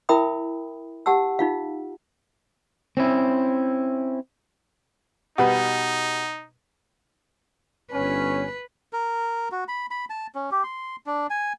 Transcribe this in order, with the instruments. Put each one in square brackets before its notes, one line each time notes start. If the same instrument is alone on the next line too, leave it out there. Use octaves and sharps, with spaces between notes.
[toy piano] E4 A#4 E5 G5 B5 D#6
G4 F#5 A5 E6
D#4 F4 F5
[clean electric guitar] C4 C#4 E4
[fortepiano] B2 G3 B4 [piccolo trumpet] D#4 [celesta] F#5
[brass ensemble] G1 C#4 [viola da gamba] B4
[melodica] A#4
F#4
B5
B5
A5
C#4
G4
C6
D4
G#5